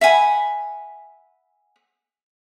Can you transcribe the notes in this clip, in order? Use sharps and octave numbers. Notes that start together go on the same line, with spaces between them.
E5 F#5 G#5 B5